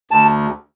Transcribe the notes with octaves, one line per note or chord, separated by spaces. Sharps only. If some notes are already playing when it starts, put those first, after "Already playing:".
D2 A5